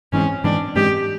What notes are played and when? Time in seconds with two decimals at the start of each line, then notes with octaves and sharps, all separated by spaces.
0.13 G#2 E3 G#3 C4 C#4
0.44 G#2 E3 G#3 C4 D4
0.76 G#2 E3 G#3 C4 G4